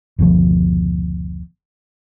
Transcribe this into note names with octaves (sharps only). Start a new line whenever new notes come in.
F#1 D2 B2 F3